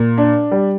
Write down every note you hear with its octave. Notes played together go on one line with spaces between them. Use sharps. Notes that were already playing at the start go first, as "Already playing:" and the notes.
Already playing: A#2
D4
G3